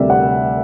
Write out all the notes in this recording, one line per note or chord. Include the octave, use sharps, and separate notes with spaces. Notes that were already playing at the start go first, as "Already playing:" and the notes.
Already playing: D2 C3 G3 D5 E5
F#5